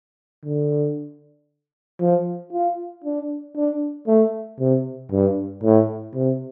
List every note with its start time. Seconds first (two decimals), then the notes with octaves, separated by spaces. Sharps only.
0.45 D3
2.00 F3
2.53 F4
3.04 D4
3.57 D4
4.07 A3
4.60 C3
5.12 G2
5.63 A2
6.14 C3